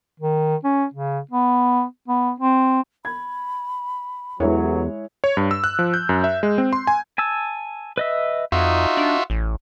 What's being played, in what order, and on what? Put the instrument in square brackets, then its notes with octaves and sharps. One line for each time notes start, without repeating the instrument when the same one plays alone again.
[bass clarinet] D#3
C#4
C#3
B3
B3
C4
[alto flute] B5 [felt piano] G#6
[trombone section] A1 F#3 [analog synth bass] E2 [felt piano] G#3 E4 C#5
[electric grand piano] C#5
G2
E6
F#6
F3
G6
F#2
E5
G#3
C4
C6
G#5
[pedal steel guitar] G#5 A5 E6
B4 D#5 E5
[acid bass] F2 [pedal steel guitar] D#4 [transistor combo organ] F4 F#4 E5
[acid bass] D4
A1